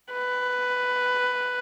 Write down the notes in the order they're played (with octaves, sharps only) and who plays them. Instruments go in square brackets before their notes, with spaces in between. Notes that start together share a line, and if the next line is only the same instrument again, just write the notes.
[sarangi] B4